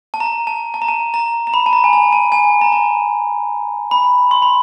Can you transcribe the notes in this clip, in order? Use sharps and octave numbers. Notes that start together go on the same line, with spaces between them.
A5
A#5
A5
A5
A#5
A5
A#5
A#5
B5
A5
A#5
G#5
A5
A5
G#5
A#5
A5
B5
C6
B5